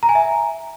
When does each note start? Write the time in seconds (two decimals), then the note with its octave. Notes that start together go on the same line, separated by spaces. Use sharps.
0.03 A#5
0.09 G#5
0.15 E5